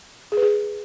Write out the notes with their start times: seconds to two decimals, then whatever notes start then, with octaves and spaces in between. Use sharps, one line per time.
0.32 G#4
0.37 B4
0.42 G#4